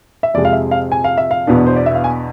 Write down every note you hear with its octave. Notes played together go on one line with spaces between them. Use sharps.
E5
F2 C3 G#3 D5
F5
E5
F5
G#5
F5
E5
F5
E2 B2 B3 D4
C5
D5
E5
F5
G#5